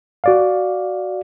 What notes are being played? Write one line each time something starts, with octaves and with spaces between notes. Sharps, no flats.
F#4 D5 F5